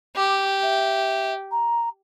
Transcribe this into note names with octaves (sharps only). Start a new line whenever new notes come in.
G4 D6
E5
A#5